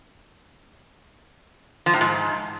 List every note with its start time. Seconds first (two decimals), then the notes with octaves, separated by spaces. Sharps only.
1.86 F3
1.94 A2
2.01 G#2